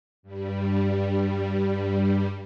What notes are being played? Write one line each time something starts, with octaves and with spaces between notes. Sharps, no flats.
G2 G3